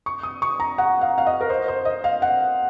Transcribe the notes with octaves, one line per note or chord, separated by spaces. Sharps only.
C#6
D#6
C#6
A#5
F#5
F5
F5
D#5
A#4
C5
C5
D#5
F5
F#5